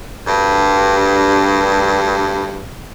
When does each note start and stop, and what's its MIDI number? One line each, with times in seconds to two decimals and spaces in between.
0.27 2.64 38
0.27 2.64 43